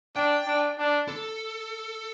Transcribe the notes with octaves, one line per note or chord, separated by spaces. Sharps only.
D4 G5
D4
D4
A4